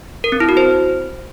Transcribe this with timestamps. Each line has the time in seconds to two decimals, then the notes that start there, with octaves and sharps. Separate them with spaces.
0.24 A#4
0.32 C4
0.40 E4
0.49 F#4
0.57 C5